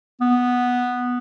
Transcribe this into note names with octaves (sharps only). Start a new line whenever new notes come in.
B3